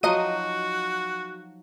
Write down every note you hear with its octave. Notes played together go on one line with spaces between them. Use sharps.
F3 F#3 D#4 F#4 D#5 D#7